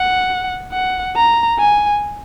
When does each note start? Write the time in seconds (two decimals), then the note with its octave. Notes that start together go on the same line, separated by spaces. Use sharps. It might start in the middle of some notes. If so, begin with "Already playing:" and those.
Already playing: F#5
0.73 F#5
1.16 A#5
1.59 G#5